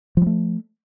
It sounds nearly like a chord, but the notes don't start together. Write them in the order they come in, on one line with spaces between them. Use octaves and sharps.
F3 G3 A3